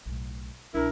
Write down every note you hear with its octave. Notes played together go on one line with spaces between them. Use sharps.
B1 A2
C2 B2 D4 E4 A#4